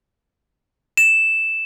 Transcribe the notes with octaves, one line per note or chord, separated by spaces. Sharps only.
E7